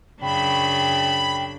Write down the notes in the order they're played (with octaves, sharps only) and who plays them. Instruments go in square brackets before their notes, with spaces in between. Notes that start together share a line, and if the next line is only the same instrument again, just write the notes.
[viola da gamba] F#2 C#3 D4 [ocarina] G5 [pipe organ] B5